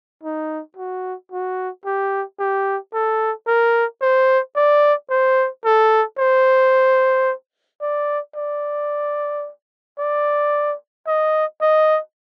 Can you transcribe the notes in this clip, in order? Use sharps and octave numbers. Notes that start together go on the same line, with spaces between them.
D#4
F#4
F#4
G4
G4
A4
A#4
C5
D5
C5
A4
C5
D5
D5
D5
D#5
D#5